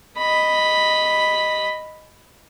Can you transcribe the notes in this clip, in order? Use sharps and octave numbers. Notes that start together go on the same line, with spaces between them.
D#5 B5